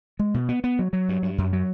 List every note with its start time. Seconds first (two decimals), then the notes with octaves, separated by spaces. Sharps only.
0.19 G#3
0.34 B2
0.49 B3
0.64 B3
0.79 F#3
0.93 F#3
1.09 G2
1.22 G2
1.38 F#2
1.53 F#3